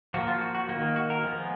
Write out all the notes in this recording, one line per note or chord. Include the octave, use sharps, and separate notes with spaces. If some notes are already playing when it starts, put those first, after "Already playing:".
F3 A#3 F#4
F4
F#4
F#4
D#3 A#3 F#4
F#4
A#4
F3 G#3 B3